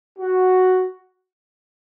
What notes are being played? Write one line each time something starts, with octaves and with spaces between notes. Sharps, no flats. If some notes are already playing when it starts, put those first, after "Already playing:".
F#4